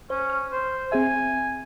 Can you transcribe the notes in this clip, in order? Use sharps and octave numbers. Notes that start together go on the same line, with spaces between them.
C#4 C5
F6
C5
C4 G#4 E5 G#5